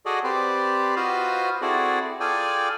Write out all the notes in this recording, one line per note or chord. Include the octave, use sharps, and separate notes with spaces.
F#4 G#4 A4 D5 D#5
C4 G4 B4 C5 D5
F4 F#4 B4 C5 D#5 F5
C4 E4 F#4 G#4 A4 D5
F4 G#4 A4 D5 G5 G#5